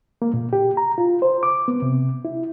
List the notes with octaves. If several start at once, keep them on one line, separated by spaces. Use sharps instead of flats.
A#3
A#2
G4
A#5
F4
C5
D6
B3
C3
E4